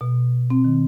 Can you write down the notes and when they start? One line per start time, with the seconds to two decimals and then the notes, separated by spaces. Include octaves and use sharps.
0.01 B2
0.50 C4
0.64 D#3